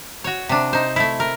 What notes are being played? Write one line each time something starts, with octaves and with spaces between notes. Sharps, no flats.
F#4 C#5
C3 D4
D#4 C5
A3 E4
A#4